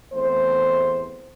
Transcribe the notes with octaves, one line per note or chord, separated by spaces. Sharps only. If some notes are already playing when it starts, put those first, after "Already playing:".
E2 A3 C4 C5